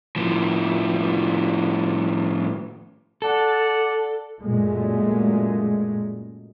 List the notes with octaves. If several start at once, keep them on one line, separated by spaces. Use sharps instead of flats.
A2 F3
A4 D5 F#5 A5
F#2 A#2 G#3 A3